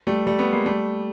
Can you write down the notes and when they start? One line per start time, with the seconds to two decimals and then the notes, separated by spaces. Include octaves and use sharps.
0.07 G3 A3
0.27 G3 A3
0.39 A3 B3
0.52 G#3 A#3
0.66 G3 A3